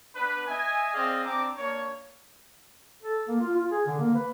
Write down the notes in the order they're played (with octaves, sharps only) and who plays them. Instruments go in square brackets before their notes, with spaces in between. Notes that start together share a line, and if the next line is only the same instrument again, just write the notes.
[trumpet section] B3 D4 B4
D#5 E5 G#5
C4 G#4 D5 D#5 F5
C4 D4 A#5 D6
A#3 D4 C#5
[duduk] A4
A#3
F4
F4
G#4
D3
A#3
B4